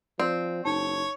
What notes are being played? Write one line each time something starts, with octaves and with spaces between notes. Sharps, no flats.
F3 C4 D5
F#1 D#4 C#5 A5